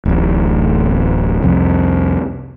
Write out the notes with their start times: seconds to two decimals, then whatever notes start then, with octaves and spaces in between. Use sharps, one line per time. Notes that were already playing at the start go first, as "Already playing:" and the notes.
0.05 D1 A1
1.42 C2 F2